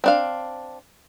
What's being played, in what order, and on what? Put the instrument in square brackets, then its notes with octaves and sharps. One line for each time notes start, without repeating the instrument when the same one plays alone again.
[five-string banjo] C4 D4 F5